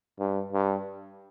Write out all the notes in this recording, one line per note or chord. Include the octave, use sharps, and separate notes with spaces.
G2
G2